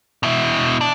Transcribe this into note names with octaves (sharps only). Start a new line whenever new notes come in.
B2 E4
D4